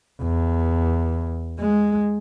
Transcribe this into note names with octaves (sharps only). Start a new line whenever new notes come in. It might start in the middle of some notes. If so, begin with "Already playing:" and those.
E2
G#3